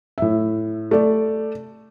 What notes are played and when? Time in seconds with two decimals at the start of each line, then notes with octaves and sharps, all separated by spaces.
0.18 A2 E5
0.91 A3 D5